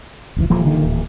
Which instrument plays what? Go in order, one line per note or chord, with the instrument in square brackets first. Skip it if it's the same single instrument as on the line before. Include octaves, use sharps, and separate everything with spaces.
[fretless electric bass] F1 C#2 E3
[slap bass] D#1 E3 A#3 [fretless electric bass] F3
[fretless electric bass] D3 D#3
D1